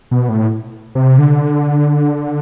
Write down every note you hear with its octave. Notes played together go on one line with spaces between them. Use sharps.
B2
A2
C3
D3